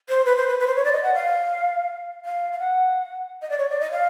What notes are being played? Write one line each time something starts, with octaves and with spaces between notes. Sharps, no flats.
C5
B4
C5
B4
B4
C5
C#5
D5
D#5
F#5
F5
F5
F5
F#5
D#5
D5
C#5
D5
D#5
F5